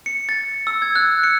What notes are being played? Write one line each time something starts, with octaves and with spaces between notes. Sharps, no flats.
C#7
A6
E6
G#6
F#6
C#7